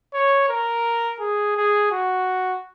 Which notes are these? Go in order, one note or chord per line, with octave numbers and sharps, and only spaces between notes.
C#5
A#4
G#4
G#4
F#4